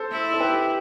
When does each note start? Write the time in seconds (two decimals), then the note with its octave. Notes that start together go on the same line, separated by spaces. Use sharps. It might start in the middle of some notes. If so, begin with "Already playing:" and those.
Already playing: A4 C5
0.11 E4
0.33 A4
0.40 G4 B4